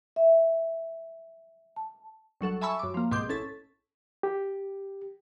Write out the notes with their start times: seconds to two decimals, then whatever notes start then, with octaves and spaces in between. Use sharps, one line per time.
0.16 E5
1.76 A5
2.41 G1 F#3 A4 F#5
2.61 E5 G#5 A5 B5 C#6 E6
2.79 F#2 D6
2.94 F3 A#3
3.11 C2 G#2 B2 C6 D6 G6
3.29 A1 C#4 A4 A6 B6
4.23 G4